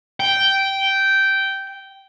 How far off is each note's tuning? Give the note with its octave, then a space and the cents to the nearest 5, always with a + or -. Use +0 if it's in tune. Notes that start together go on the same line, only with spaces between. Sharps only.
G5 -10